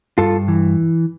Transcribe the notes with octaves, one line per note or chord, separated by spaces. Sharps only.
G2 F4 A4
E3